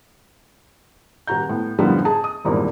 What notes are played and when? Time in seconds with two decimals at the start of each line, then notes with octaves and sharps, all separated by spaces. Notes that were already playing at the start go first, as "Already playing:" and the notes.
1.27 D#1 F#4 A#5 G6
1.49 A2 B3
1.79 F#2 A2 D3 F3 G3 B3
2.05 G#4 A5
2.24 D#6
2.45 G#1 E2 G2 A#2